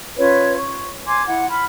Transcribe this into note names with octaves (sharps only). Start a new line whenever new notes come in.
C#4 F4 B4 C#5
C#6
G#5 C6 D6 G#6
E4 F#5
B5 F6